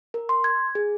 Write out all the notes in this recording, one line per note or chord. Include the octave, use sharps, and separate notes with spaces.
A#4
C6
G#6
G#4